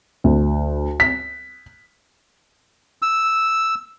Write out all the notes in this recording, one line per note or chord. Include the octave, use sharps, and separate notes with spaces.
D2
B6
E6